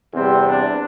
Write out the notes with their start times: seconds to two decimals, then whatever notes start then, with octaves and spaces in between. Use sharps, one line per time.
0.12 E2 C3 G3 C4
0.47 D4